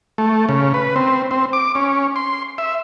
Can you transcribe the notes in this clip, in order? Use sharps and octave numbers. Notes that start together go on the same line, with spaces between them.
A3
C#3
B4
C4
C4
D6
C#4
C6
E5